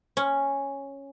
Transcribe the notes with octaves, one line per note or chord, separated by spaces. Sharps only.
C#4